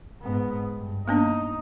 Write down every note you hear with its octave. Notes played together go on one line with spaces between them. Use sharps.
G#2 B3
G2
A#3 B3 D4 D#4